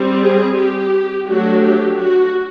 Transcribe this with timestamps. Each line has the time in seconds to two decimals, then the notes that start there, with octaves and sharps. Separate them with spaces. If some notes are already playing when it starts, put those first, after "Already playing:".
Already playing: G3 C4
0.22 G#4
0.57 G4
1.27 F#3 A3 D4 F#4
1.63 G4
1.98 F#4